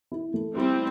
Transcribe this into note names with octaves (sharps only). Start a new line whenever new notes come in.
E4
A3
G3 C4 E4